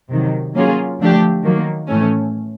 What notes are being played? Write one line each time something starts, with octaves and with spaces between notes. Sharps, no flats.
C3 D#3 F#3
F#3 A#3 C#4 F4 G#4
D3 F3 A3 D4 G4
D#3 F#3 A#3
A2 E3 A3 C#4